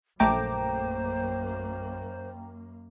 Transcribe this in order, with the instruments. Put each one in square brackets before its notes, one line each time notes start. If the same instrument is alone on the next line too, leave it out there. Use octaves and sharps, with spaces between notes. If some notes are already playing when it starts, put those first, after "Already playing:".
[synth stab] A#1 A3 D6 [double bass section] F#2 A#3 [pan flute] C5 [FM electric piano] G5 A#5